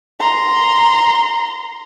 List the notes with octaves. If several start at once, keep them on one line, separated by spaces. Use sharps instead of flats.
A#5 C6